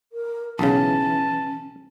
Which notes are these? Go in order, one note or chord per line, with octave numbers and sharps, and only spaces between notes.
A#4
B1 C#3 E3 C#4 A5